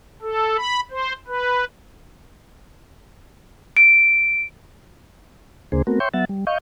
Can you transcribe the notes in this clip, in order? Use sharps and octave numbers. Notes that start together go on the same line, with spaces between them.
A4
B5
C5
B4
D7
D2 C#3 A#3 D4 G#4 C5
A3 B3 C4 F#4 A#4
C#5 E5 G5 C6 C#6 G6
F#3 B3 E5 F#5 A6
G3
D#5 F5 C#6 G6